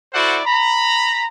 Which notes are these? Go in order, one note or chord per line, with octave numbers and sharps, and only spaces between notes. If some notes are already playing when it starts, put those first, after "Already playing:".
E4 F#4 A4 C5 D5 F#5
A#5 B5